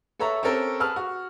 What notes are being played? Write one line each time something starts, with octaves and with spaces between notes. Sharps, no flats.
A4 B4 C#5 E5 A#5
C4 C#4 G4 A4 A#4 C#5
G#4 B4 A5 F6
F#4